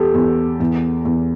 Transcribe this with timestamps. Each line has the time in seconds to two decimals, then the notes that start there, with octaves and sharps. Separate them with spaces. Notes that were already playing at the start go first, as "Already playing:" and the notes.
Already playing: E2 G4 A4
0.14 E2
0.60 E2
1.05 E2